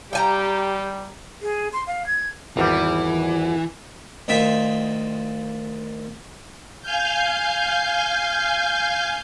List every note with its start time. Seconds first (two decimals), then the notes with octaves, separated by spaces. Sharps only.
0.13 G3 G4 G5 G#5 A#5
1.42 G#4
1.73 C6
1.87 F5
2.07 G#6
2.57 G#1 E2 E3 G3
4.28 D2 D#3 F4 E5 G5 B5
6.82 F5 G#5 F6 G6